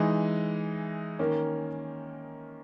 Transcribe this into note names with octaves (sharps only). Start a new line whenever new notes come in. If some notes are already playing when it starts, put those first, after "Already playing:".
Already playing: E3 G#3 D#4
D#3 A#3 C#4